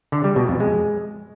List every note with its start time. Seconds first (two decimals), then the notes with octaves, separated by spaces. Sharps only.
0.12 D3
0.24 G3
0.36 B2
0.48 F2
0.60 G#3